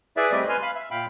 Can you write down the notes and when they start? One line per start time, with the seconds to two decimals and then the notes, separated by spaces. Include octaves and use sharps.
0.17 E4 G#4 B4 D5 E5
0.32 G3 A3 C4 G4 D5 D#5
0.49 B4 G#5 C6 F6
0.62 F5 B5
0.75 E5
0.91 A#2 F5 G5 B5